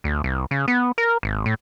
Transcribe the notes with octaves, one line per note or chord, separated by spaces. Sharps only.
D2
C2
C#3
B3
A#4
G#1
A2